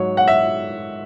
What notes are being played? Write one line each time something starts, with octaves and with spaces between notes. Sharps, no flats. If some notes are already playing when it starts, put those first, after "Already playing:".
Already playing: G#2 F#3 C#5
F#5
E5